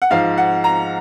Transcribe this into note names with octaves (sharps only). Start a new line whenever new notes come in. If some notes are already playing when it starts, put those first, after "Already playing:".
F#5
G#2 F3 F5
F#5
A#5